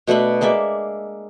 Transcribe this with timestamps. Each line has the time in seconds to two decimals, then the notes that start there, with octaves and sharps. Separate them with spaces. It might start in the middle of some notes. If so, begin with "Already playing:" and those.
0.07 B2 A3 D4 B5
0.41 G#3 A#3 D5 E5